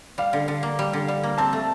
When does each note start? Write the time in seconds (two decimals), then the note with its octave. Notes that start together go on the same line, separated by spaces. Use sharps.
0.18 G3 F5
0.33 D3
0.48 D3
0.63 A#3
0.79 G3
0.93 D3
1.08 G3
1.23 A#3
1.38 C4 A5
1.53 A3